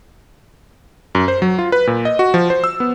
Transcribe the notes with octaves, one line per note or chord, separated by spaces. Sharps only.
F#2
C5
F#3
F4
B4
A#2
D#5
F#4
F3
C5
E6
B3